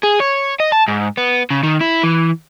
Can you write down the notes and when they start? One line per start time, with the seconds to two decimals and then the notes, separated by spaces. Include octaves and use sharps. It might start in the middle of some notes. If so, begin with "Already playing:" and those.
0.04 G#4
0.20 C#5
0.60 D#5
0.72 A5
0.88 G#2
1.17 B3
1.50 C#3
1.63 D#3
1.81 E4
2.03 E3